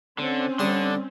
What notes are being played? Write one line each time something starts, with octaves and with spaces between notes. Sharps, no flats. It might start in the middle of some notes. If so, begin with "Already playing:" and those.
D3 C4 C#4
D3 G3 C6 D#6